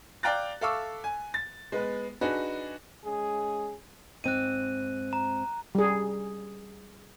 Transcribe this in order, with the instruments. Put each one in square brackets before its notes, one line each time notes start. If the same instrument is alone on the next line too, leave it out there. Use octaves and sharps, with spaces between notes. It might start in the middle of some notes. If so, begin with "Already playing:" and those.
[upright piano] D5 F5 G5 A#5 F#6 A6
A4 E5 F5 C#6 D6 E6
G#5
A6
G#3 B3 B4
D4 D#4 F#4 G#4 B4
[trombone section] G#3 C#4 G#4
[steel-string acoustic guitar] G#2 C4 [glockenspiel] F#6 D#7
[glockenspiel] A#5
[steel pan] G3 G#4